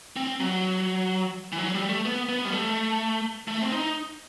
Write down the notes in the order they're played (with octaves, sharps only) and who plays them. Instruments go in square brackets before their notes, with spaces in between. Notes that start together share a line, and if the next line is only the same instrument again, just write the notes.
[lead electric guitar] C4
F#3
E3
F#3
G3
A3
B3
B3
G3
A3
A3
C4
D#4